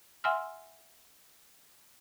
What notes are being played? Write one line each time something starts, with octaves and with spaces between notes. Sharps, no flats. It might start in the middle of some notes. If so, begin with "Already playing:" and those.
E5 F#5 G#5 C6 E6 F6